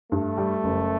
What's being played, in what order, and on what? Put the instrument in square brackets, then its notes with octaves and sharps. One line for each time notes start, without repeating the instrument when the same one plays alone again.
[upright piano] G2 [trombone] A3
[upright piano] G3
F#1